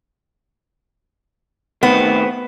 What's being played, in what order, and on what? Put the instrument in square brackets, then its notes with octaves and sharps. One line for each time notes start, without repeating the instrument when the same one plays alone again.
[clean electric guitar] A2 D#3 C4 [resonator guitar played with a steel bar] B3